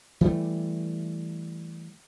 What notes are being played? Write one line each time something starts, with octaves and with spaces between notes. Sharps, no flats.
E3 G3 A3